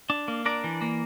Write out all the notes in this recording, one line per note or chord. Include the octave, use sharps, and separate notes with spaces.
D4
A#3
D4 A#4 D5
E3
A#3